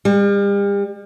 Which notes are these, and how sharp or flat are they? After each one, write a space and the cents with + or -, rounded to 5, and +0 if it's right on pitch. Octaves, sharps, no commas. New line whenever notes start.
G3 +40